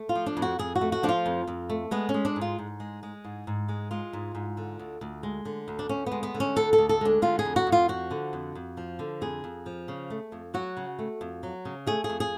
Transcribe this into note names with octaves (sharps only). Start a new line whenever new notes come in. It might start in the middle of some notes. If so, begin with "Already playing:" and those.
Already playing: A3
F4
F3
D4
F2
F#4
F2 G#4
F#4
A3
F#4
F3 D4
F4
F2
F2
A3
G#3 B3
C#4
G#3
D4
G#2
F4
G#2
G#3
G#3
G#2
G#2
G#3
G#3 F4
G#2
G#2
D3
D2
D2
G#3
D3
D2
D4
D2 C#4
B3
G#3
B3
D3
C#4
D2 A4
A4
D2
A4
G#3 D4
D3 F4
G#4
F2
F#4
F2
F4
F3 F#4
D3
F2
F2
F3
D3
F2 G#4
F2
F3
C#3
A3
F2
F#3 F#4
C#3
A3
F2
F#3
C#3
A3 G#4
G#4
F2
G#4